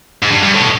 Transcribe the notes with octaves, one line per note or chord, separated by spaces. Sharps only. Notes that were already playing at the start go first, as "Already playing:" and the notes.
G#2
G2
G2
A2
B2